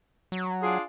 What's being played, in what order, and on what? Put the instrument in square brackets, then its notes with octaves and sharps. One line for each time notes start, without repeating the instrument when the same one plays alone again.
[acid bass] F#3
[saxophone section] D4 F4 G#4